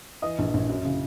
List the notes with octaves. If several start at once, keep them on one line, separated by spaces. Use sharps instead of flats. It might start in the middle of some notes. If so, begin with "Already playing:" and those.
E3 D#5 D#6
A#1
A#1
F#2
C#3